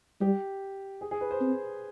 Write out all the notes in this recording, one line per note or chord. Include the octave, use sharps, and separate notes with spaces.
G3 G4
G#4
G#4
B4
C5
C4